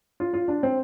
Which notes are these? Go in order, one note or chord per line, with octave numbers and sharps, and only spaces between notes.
F4
F4
D4
C4